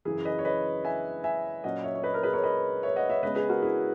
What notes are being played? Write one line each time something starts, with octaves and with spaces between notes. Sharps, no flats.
F#2 C#3 E3 E4 G#4
B4 D#5
C#5
B4 D#5
E5 G#5
E5 G#5
A#2 F#3 C#4 D#5 F#5
C#5 E5
C#5
B4 D#5
A#4 C#5
G#4 B4
A#4 C#5
B4 D#5
C#5 E5
D#5 F#5
C#5 E5
C#3 G#3 B3 B4 D#5
G#4 B4
F#4 A#4
E4 G#4